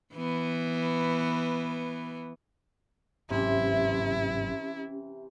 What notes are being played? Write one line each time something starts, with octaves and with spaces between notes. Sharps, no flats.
E3 B3
G1 G#2 C3 E3 F#3 C#4 E4 G4